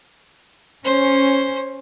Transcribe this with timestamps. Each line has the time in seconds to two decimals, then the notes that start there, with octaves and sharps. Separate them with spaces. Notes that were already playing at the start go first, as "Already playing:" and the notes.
0.84 C#4 C5